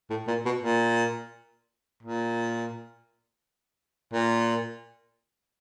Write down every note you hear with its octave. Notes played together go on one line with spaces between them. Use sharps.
A2
A#2
B2
A#2
A#2
A#2